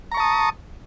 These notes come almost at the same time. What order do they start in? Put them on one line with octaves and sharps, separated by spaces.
A#5 C#6 A5 D#6